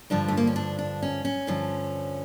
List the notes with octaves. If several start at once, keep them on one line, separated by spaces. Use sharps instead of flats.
G2 D3 F3 D4
A3
A#3
C#4
D4
D4
C#4
C#4
G2 D3 F3